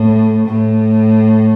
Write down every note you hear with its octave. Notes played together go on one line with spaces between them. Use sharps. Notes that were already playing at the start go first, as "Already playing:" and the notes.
Already playing: A2
A2